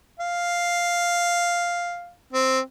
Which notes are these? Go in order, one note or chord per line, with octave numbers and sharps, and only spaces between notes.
F5
C4